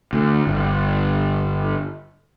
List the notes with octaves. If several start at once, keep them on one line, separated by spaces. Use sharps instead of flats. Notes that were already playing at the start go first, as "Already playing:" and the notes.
D2
G1